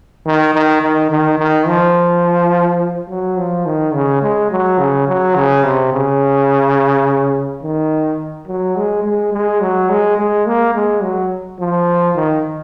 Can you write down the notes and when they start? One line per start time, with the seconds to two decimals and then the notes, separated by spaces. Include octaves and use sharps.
0.26 D#3
0.54 D#3
0.82 D#3
1.10 D#3
1.38 D#3
1.67 F3
3.10 F#3
3.37 F3
3.66 D#3
3.94 C#3
4.22 G#3
4.51 F#3
4.79 C#3
5.08 F#3
5.36 C#3
5.64 C3
5.93 C#3
7.63 D#3
8.48 F#3
8.76 G#3
9.04 G#3
9.33 G#3
9.61 F#3
9.90 G#3
10.18 G#3
10.47 A#3
10.74 G#3
11.03 F#3
11.59 F3
12.16 D#3